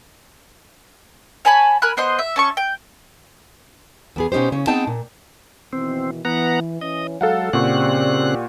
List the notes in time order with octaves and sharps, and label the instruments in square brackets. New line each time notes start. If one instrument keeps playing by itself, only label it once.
[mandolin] C#5 G#5 A5 B5
A#4 G#5 B5 F#6
B3 C5 D#5 C6
E5
C#4 A5 C#6
G5
[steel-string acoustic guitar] E2 B3 G#4
B2 C#4 D#4 G4 C5
C#3 C#4
B3 C4 D#4 G#4 G5 A5
A#2
[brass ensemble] B2 D#3 E3 [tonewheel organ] C4
[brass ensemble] E3 [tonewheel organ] B3 F#5 A#5
[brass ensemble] E3 C#4 [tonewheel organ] D#5
[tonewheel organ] F#3 [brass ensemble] G#3 [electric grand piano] A4 F5 F#5
[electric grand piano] A#2 F#5 C#6 [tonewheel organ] C#3 C4 F#6 [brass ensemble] G4 D5